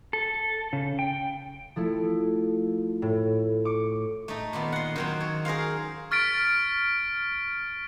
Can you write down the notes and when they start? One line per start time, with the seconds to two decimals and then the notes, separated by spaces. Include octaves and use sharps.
0.13 A4
0.73 C#3
0.99 G5
1.76 F3 A3 E4
3.02 A2
3.65 C#6 D6
4.28 A3 D#4
4.53 A#2 D#3 B3
4.72 F#5 C6
4.96 D#3 F#3 C4
5.20 C#5
5.45 G#4 A#4 C5 F5
6.11 C#6 F6 A6 B6 D7